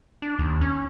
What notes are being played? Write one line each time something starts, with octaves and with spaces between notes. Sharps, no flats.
D4
D#2
C#4